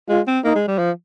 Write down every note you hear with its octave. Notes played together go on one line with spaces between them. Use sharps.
G#3 F4
C4
A#3 D#4
G#3
G3
F3